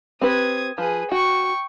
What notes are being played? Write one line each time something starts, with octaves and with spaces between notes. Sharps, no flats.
C4 G4 B4 D#6 G#6
F3 G#4 B4
F#4 G5 C#6